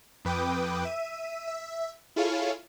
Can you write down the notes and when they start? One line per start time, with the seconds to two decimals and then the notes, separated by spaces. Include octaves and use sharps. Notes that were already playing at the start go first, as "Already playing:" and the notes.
0.25 F2 B4 G5 D6 D#6
0.85 E5 D#7
1.47 E5
2.16 E4 F4 G#4 A4 C#5 F5